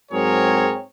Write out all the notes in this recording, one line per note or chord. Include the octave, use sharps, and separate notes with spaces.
G#2 F#3 C4 G#4 A#4 C#5